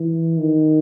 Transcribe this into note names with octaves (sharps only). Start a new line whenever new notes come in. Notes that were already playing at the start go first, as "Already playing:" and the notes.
Already playing: E3
D#3